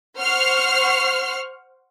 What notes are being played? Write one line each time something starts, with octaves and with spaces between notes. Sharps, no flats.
C5 F#5 C#6 F6 C7